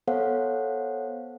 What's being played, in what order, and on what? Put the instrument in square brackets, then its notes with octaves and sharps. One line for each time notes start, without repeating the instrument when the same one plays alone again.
[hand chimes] B3 A4 C5 C#5 F5 F#5